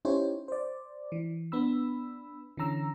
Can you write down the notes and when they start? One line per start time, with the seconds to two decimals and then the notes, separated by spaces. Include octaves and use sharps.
0.05 C#4 D#4 E4 G4 C5 C#5
0.48 C5 D5
1.12 E3
1.52 B3 D4 B5 E6
2.57 D3 E3 C#4 A#5 E6